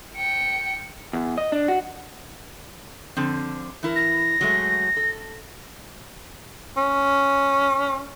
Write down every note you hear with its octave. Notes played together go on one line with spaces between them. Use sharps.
G5 C#7
E2
D#5
D4
F#4
D3 F3 C4
E3 E4 A#4
A#6
F#3 G#3 A3
A4
C#4